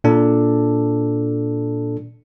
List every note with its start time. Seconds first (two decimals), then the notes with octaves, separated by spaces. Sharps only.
0.04 A#2 D4 A4